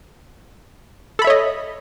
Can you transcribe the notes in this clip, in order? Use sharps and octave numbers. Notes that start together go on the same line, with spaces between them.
A4 C#5 D#5 E5 B5